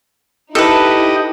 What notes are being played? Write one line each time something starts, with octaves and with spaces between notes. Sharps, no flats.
D#4 E4 G4 A4 B4 D#5